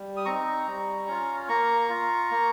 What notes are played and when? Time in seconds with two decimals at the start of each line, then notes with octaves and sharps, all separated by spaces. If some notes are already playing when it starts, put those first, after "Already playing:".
Already playing: G3
0.17 D#6
0.25 C4 D#4 A#5 C#6
0.68 G3
1.07 C#4 F4
1.48 A#3 A#5 C#6
1.90 F4
2.31 A#3